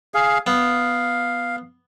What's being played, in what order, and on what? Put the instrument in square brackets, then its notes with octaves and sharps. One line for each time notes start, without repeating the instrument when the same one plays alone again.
[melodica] G#4 F5
[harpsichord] B3 [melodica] F5